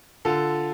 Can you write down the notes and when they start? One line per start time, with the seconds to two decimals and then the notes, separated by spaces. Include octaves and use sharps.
0.25 D3 F4 A4